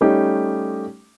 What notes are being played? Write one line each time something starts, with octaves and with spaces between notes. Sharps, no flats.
G3 A3 C#4 D#4 G4